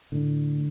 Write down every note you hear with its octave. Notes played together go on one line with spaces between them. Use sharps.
A2 D3